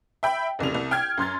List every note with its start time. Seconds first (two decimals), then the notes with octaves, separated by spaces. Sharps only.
0.23 E5 G5 B5
0.59 F1 C2 C#3 F7
0.75 C2
0.91 G5 F6 G#6
1.18 F#2 C6 F6 A6